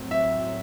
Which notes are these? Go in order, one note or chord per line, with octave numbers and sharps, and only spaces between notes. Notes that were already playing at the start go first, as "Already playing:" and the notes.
Already playing: A2 F#3 C4
E5